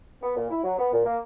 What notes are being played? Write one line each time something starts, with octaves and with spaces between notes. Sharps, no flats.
B3
A#2
E4
F#3
B3
A#2
A#3